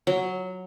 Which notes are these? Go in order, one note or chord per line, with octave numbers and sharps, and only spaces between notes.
F#3